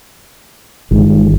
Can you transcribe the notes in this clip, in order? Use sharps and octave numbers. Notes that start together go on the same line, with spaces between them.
G1 D#3 G#3